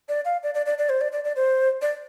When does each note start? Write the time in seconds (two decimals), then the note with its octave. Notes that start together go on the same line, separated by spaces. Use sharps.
0.09 D5
0.25 F5
0.43 D5
0.55 D5
0.66 D5
0.78 D5
0.89 C5
1.01 D5
1.12 D5
1.24 D5
1.36 C5
1.82 D5